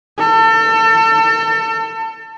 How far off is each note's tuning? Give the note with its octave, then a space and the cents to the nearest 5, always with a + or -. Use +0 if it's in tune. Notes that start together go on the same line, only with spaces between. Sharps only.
A4 +35